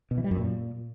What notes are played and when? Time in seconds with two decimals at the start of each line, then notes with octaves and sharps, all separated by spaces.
0.11 B2
0.18 E3
0.24 G3
0.31 F#2
0.38 A#2